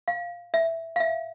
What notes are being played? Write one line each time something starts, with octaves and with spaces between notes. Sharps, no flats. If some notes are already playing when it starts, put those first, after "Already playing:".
F5
E5
F5
E5